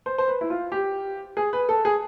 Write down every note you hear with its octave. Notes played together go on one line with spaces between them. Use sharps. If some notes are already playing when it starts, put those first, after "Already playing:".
C5
C5
B4
E4
F4
G4
G#4
B4
A4
G#4